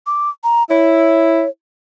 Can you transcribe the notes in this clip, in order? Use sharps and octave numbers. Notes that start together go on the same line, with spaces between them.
D6
A#5
E4 C#5